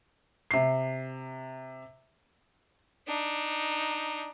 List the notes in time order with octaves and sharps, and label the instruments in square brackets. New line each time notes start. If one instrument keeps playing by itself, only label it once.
[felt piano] C3 C7
[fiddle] D4 D#4